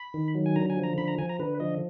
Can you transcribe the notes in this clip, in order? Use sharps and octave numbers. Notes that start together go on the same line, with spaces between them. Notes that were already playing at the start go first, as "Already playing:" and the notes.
Already playing: B5
D#3
F#3
G#5
D3 A#5
G#5
F3
A#5
D3 B5
A#5
F3 G#5
A#5
D3 B4
F3 D#5